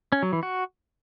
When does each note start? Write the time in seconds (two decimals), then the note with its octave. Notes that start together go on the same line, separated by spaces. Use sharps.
0.12 C#4
0.23 F#3
0.33 E3
0.43 F#4